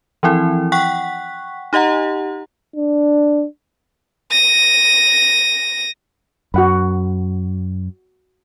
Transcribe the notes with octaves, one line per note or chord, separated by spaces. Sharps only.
E3 F3 C4 E4
F#5 G5 C#6 F#6 B6
D#4 G4 D#5 F#5 A#5
D4
A#6 D#7
F#2 F#4 F#5 B5